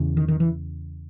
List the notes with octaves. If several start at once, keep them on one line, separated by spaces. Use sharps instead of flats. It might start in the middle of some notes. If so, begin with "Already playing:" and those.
Already playing: E2 C#3
D#3
D#3
E3